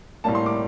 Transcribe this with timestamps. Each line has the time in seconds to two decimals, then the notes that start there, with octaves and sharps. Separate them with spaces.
0.24 A2 G3 A#3 A5
0.35 C6
0.46 D6